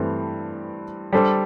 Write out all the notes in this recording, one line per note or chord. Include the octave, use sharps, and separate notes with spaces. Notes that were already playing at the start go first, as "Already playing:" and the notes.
Already playing: G2 E3 A3 C4
G3 D4 A4 C5